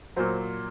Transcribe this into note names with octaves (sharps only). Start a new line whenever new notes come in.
A#2 F#3 C5